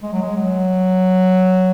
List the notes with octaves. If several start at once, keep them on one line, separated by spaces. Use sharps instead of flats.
G#3
F#3
G#3
F#3